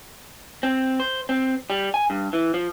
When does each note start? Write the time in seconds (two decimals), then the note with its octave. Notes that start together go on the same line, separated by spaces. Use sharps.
0.63 C4
1.00 C5
1.29 C4
1.70 G3
1.94 G#5
2.10 G2
2.33 E3
2.54 F3